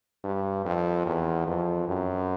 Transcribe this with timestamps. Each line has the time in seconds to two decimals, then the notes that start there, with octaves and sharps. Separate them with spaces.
0.24 G2
0.65 F2
1.06 E2
1.47 F2
1.88 F#2